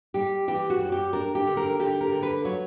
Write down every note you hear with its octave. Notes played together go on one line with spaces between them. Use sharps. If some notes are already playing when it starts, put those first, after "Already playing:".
G3 G4
E3 G4
F#4
F#2
G4
D4 A#4
G4
D3
A#4
D3 G4
A#4
D3
B4
F#3 C#5